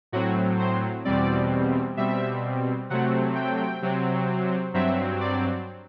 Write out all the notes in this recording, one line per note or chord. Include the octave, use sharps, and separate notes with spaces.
A2 F#3 C4 F#4
C5
E2 B2 G3 C4 D5
B2 G3 C4 E5
C3 F#3 A3 C4 F#5
G5
C3 F#3 C4
G2 F#3 C4 E5
D5